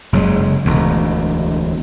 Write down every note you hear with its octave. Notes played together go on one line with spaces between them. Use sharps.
F#1 C#3 F#3 G#3
E1 D2